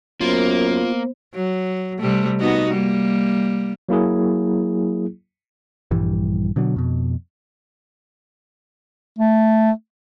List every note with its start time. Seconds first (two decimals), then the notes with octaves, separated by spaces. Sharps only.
0.21 F#2 A#3 B3 F4 C5
1.34 F#3
1.99 C3 G3 A3
2.40 B3 D#4 F#4
2.71 G3 A#3
3.89 F#3 A#3 E4 G#4
5.91 A#1 G2 E3 G3
6.56 B2 D3 F#3
6.76 F2 B2
9.19 A3